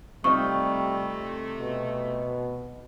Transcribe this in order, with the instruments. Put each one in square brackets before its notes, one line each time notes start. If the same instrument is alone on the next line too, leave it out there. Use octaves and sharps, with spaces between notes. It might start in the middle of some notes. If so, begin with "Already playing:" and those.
[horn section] C3 A3 [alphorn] G3 [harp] C4 D#4 F4 [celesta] C#6
[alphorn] B2